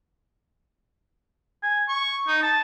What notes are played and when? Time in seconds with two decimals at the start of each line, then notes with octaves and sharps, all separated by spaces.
1.63 G#5
1.88 C#6
2.27 D#4
2.43 A5